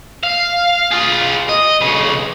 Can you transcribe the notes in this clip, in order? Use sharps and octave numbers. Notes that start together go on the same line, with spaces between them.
F5
F4 G#4
D#5
B1 C#3